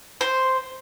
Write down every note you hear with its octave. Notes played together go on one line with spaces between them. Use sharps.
C5